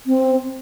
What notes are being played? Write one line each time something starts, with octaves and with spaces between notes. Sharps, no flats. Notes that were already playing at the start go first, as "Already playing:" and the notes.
C4